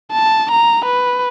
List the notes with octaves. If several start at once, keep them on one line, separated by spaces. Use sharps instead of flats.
A5
A#5
B4